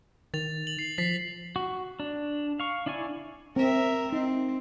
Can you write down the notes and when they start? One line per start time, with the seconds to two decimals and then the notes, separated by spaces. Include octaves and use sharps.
0.34 D#3 A6 F7
0.67 F#7
0.79 C7
0.98 F3 A6 B6 C7
1.56 F#4
2.00 D4
2.60 F5 C#6
2.86 D4 E4 D5 G#5 C#6
3.56 C4 A#4 E5
4.12 C4 D#4